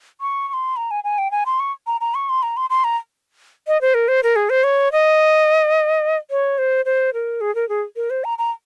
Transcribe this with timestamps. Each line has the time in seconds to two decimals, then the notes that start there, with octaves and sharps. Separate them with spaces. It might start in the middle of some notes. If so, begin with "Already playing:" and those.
0.21 C#6
0.48 C#6
0.53 C6
0.76 A#5
0.91 G#5
1.04 G#5
1.18 G5
1.31 G#5
1.46 C6
1.60 C#6
1.87 A#5
2.01 A#5
2.15 C#6
2.29 C6
2.43 A#5
2.57 C6
2.70 C6
2.84 A#5
3.67 D#5
3.81 C5
3.94 A#4
4.08 C5
4.23 A#4
4.36 G#4
4.50 C5
4.64 C#5
4.92 D#5
6.31 C#5
6.58 C5
6.85 C5
7.14 A#4
7.41 G#4
7.55 A#4
7.69 G#4
7.96 A#4
8.10 C5
8.24 A#5
8.38 A#5